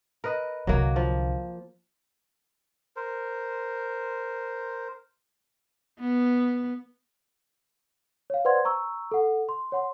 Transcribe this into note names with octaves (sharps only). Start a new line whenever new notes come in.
A#4 B4 D#5
C2 D3 F#3 A#3
F3
A#4 C5
B3
C#5 F5
B4 C5 D5 F#5 C6 G#6
A#5 C#6 E6
A4 F#5
C6
C#5 F#5 C6